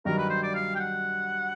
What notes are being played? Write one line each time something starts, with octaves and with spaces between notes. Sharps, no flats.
G2 D#3 F#3 A#4
B4
C5
D5
F5
G5
F#5